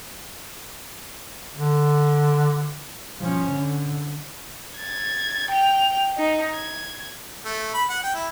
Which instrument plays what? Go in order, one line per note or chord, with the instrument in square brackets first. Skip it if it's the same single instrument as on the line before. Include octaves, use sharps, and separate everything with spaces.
[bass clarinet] D3
[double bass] F3 C#4
D3
[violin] G#6 A6
G5 F7
D#4
G#6
[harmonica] A3
B5
F#5
G5
E4